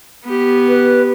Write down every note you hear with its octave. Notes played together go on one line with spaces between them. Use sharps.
B3 G4
B4